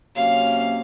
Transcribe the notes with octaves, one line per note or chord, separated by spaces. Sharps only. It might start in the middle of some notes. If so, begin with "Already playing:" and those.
C3 F#3 A#3 C#4 F5